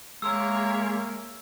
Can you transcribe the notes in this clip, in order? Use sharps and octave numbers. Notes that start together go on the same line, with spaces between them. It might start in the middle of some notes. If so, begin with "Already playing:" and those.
G#3 A#3 A#4 C#5 E5 G#5 C6 E6